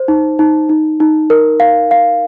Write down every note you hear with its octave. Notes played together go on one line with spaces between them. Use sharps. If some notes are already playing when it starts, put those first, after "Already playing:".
Already playing: C5
D#4
D#4
D#4
D#4
A#4
F5
F5